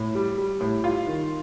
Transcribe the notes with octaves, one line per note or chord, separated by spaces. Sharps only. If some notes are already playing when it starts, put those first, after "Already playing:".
Already playing: A2
G3
G3
A2
G3 F4
D#3